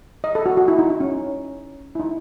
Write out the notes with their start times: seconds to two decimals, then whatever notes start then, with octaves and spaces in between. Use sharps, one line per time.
0.24 D#5
0.35 A4
0.46 F#4
0.57 F#4
0.68 E4
0.79 D#4
0.90 D#4
1.00 C#4
1.95 E4
2.00 D#4